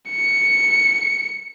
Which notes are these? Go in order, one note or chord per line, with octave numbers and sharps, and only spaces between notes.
C#7